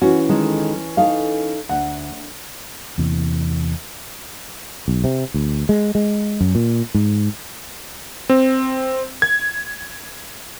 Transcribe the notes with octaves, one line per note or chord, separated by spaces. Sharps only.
E3 C#4 F#4
D#3 G#3 A4
D#4 A4 F5
D2 F#5
E2 C3 E3 A#3
B1
C3
D2
G#3
G#3
F#2
A#2
G#2
C4
G#6